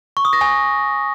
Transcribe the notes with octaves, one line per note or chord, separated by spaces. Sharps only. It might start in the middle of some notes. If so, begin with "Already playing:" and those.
C#6
D#6
A#6
G#5